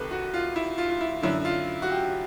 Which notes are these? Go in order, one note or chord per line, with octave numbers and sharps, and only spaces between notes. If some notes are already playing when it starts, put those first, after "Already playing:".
Already playing: C2 C3 D#3 A4 B4
F#4
F4
E4
F4
F4
E4
F#2 D3 E4
F4
F#4
G4